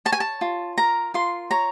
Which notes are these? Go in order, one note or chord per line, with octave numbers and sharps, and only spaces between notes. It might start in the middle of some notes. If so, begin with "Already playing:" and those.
C#5 A5
G#5
A5
F4
A#4 A#5
F4 C6
C#5 A#5